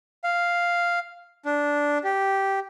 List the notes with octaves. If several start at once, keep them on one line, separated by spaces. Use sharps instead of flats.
F5
D4
G4